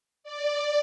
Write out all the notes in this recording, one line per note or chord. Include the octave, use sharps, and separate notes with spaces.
D5